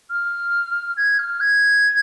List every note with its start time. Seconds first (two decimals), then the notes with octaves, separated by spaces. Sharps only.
0.10 F6
0.97 G#6
1.18 F6
1.40 G#6